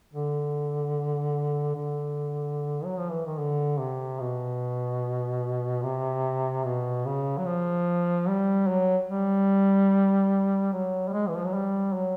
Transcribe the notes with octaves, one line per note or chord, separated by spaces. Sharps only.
D3
D3
F#3
F3
E3
D#3
D3
C3
B2
C3
B2
C#3
F#3
F3
G3
F#3
G3
F#3
G3
G#3
E3
F3
F#3
G3
F#3